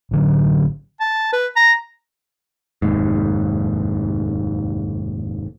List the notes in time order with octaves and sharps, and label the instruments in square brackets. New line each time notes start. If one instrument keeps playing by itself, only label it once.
[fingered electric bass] A1 D3 F#3
[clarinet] A5
B4
A#5
[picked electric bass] F1 D#2 G#2